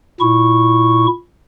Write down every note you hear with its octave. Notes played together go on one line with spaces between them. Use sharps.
A#2 E4 C#6